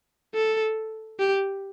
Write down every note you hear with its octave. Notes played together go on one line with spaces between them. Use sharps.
A4
G4